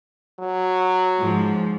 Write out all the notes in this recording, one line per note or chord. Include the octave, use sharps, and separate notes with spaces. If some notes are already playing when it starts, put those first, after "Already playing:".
F#3
G#2 F3